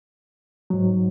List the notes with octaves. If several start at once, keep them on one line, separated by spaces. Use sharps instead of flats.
G#2 F#3